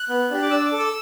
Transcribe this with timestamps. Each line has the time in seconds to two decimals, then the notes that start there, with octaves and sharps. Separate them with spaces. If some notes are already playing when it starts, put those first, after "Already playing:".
Already playing: F#6
0.09 B3
0.31 D4 G4
0.42 D6
0.51 D4 E6
0.65 D6
0.72 A4
0.79 E6